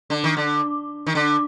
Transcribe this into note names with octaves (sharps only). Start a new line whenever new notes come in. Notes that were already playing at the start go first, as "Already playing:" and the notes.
D3
D#3
D3
D#3
D3